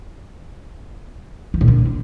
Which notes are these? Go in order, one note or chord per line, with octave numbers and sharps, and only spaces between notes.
F3
A#2
D3